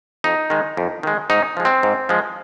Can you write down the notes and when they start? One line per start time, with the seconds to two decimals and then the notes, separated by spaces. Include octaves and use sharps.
0.24 F2 D#4
0.50 D#3 G#3
0.77 F2
1.03 D#3 G#3
1.30 G#2 D#4
1.57 F3 G#3
1.65 C4
1.83 G#2
2.09 F3 G#3